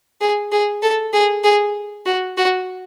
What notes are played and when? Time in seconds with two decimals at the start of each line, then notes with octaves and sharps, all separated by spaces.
0.21 G#4
0.52 G#4
0.82 A4
1.13 G#4
1.44 G#4
2.06 F#4
2.37 F#4